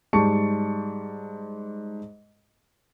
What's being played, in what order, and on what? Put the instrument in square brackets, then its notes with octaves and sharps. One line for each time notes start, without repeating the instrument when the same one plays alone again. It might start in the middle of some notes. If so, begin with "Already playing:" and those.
[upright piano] G#2 G3 A5 C#6 C#7